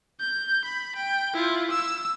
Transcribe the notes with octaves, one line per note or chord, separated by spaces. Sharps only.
G6
B5
G5
E4 F4
E6